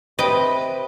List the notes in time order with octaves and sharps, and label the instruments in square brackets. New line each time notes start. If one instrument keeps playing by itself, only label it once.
[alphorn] C3 [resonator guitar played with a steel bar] B4 [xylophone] C5 G5 [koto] D#5